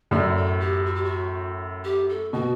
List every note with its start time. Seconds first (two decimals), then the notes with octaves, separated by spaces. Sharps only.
0.11 F#2 A2 D5
0.36 A4
0.60 G4
0.86 F#4
0.95 G4
1.04 F#4
1.84 G4
2.09 A4
2.33 B2 F#4